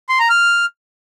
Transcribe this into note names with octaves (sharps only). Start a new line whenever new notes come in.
C6
A#5
F6